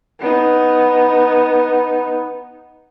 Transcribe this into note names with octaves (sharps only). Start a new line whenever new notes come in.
B3 D#4